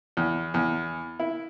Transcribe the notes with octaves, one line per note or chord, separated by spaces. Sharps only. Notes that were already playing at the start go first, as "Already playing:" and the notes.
E2
E2
E4